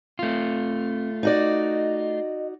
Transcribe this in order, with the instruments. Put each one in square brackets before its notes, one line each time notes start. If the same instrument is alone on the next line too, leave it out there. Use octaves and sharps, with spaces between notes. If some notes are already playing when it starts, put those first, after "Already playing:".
[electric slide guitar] A3 F4 [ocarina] C4
[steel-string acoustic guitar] D#4 F#4 D5 [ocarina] D#5